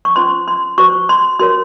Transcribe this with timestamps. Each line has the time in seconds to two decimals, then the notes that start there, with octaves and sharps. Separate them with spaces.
0.05 C#6
0.16 C#4 F4 C5 C6
0.48 C6
0.78 F#4 C5 C#6
1.09 C6
1.39 F#4 A#4 C#5 C6